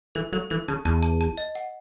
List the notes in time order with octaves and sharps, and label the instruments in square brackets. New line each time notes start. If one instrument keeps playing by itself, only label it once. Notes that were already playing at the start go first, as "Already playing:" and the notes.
[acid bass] E3 [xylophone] A4
[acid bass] F#3 [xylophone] A4
[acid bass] E3 [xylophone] A4
[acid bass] C#3 [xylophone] A5
[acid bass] E2 [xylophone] A5
[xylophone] A5
A5
D#5
F#5